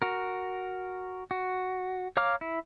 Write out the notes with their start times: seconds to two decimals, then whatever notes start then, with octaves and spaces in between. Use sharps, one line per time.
0.02 F#4 A#4
1.31 F#4
2.17 C#5 F5 A#5 D6 F6
2.41 E4